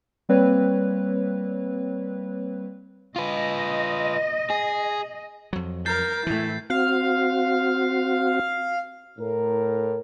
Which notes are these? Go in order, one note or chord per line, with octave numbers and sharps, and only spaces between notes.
G3 A#3 C4 B4 C#5
F4 B4 D#5
G#4
F2 F#3
A#4 G6 A6 C7
A2 E3 A3 E4
C4 F#4 F5
A2 A#4